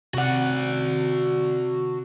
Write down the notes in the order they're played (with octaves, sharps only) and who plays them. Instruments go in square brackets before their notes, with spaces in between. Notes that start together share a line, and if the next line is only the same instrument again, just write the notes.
[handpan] C3 F#5 [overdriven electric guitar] F#4 D5